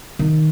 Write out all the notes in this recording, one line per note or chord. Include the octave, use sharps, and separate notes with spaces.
D#3